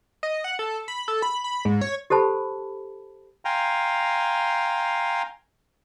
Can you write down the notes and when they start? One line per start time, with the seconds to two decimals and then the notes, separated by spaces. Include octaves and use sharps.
0.23 D#5
0.44 F#5
0.59 A4
0.88 B5
1.08 A4
1.22 B5
1.44 B5
1.65 G#2
1.81 C#5
2.10 G4 A4 C5 A5 B5
3.45 F5 G5 G#5 A#5 C6